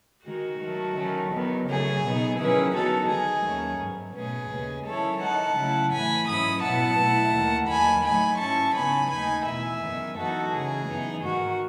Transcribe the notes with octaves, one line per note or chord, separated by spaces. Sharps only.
D#3 G#3 D#4 F#4
D#3 F#3 A3
D#3 F#3 A3 C#4
E2 D#3 F#3 B3
F#2 C#3 F#3 A3 G#4
B2 F#3 B3 D#4
D#3 F#3 C#4 E4 G#4 B4
D#3 F#3 B3 D#4 F#4 A4
D#3 G#3 D#4 G#4
D#2 D#3 F#3 A3 C#4
G#2 F#3 B3
B2 A3 C#4 G#4 B4
D#2 C#3 G#3 C#4
D#3 F#3 C#4 E4 A4 C#5
D#3 G#3 D#4 F#5 A5
C#3 F#3 A3 E4
A2 E3 A3 G#5 B5
G#2 F#3 C#4 E4 B5 D#6
B2 F#3 B3 E4 F#5 A5
B2 A3 E4
D#2 D#3 A3
D#2 D#3 F#3 G#5 B5
A2 F#3 A3 D#4 G#5 B5
G#2 F#3 C#4 E4 A5 C#6
C#3 F#3 B3 D#4 G#5 B5
D#2 D#3 A3 D#4 G#5 B5
E2 B2 A3 E4 E5 G#5
F#2 D#3 G#3 B3
F#2 E3 B3 D#4 F#4 A4
C#3 E3 G#3 G#4
F#2 E3 B3 D#4
G#2 D#3 G#3 F#4